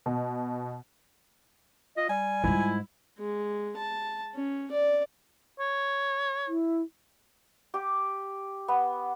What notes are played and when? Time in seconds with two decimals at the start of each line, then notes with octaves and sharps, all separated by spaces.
0.06 B2
1.97 F4 D#5
2.09 G3 G#5
2.44 G#2 G3 E4 F4
3.19 G#3
3.77 A5
4.35 C#4
4.71 D5
5.60 C#5
6.48 E4
7.74 G4
8.68 B3